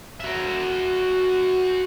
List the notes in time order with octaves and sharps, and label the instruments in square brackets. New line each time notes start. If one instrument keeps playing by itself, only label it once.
[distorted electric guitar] F#4 E5